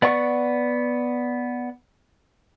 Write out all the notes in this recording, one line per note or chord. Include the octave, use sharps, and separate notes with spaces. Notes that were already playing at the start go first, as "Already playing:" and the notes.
B3 D5 F#5 C#6